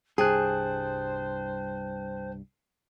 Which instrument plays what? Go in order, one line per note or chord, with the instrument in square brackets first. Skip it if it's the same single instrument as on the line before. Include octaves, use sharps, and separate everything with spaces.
[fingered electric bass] C2 G2 [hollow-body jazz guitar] G#4 [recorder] C5 [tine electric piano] G5 A5 F#6